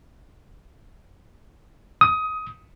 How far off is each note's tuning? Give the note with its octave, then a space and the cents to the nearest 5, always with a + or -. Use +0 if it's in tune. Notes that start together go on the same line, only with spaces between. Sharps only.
D#6 +20